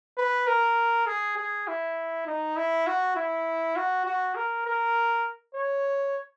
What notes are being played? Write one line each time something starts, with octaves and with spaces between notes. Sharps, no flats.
B4
A#4
G#4
G#4
E4
D#4
E4
F#4
E4
F#4
F#4
A#4
A#4
C#5